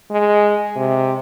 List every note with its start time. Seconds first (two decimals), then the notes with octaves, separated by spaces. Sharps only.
0.11 G#3
0.76 C3